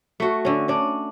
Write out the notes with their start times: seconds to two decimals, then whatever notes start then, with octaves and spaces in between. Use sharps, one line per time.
0.20 A3 F#4
0.45 D3 C#4
0.68 C#4 D4